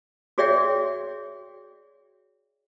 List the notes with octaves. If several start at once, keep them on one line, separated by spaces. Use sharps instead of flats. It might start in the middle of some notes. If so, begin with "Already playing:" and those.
F#4 G#4 C#5 D5 E5 G5